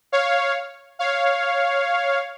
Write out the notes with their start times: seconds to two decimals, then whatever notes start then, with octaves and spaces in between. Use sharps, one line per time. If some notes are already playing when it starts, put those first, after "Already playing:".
0.12 C#5 F5
0.99 C#5 F5